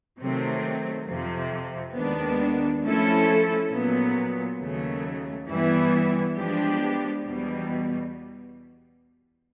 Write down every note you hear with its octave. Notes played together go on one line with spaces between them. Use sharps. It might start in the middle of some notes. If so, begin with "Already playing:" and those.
C3 D#3 F#3 A3 C4
F2 C3 F3
D#2 D#3 G#3 B3 D4
F3 A3 C#4 E4 A4
A#2 F#3 B3
D#2 C#3 F#3 A3
G2 E3 G3 B3 E4
F3 G#3 B3 D4 G4
E2 B2 G3